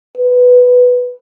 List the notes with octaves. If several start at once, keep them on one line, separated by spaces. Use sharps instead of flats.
B4